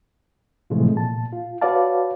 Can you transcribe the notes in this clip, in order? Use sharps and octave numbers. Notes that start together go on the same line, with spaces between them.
A2 C3 E3 F3 G#3 A3
A#2 A5
F4
F#4 B4 C#5 D5 F5 A5